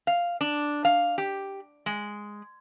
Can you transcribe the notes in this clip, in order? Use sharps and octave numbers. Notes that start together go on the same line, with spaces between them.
F5
D4
F5
G4
G#3